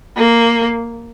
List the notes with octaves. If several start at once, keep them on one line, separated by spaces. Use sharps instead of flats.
A#3